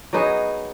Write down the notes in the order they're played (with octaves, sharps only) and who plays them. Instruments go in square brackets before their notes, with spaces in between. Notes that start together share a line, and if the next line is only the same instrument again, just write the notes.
[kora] F#3 B3 D#4 G#4